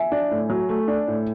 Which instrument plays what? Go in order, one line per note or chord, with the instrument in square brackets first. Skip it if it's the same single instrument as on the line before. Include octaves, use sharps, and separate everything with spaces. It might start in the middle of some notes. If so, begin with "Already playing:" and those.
Already playing: [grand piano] E5 G#5
[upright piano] D4
A2
F#3
A3
D4
A2